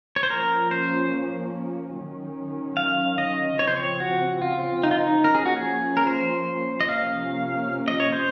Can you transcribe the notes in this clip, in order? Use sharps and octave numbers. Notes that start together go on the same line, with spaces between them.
C#5
C5
F3 A#3 C#4 A#4
C5
D#3 F#3 C#4
F5
D#5
C#3 F3 C4 C#5
C5
C#5
F#4
F4
D#4
F4
D#4
F3 A#3 C#4 A#4
G#4
F#4
G#4
A#4
C5
D#5
C3 F3 A#3 C#4 F5
D#5
C#5
C5